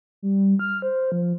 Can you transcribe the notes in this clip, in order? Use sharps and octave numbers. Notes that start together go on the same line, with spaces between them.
G3
F6
C5
F3